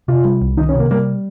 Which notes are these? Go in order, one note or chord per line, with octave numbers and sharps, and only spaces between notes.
C3 F4
G3
C2
D#3 D#4
C#4
C3
A#3
G3 A#3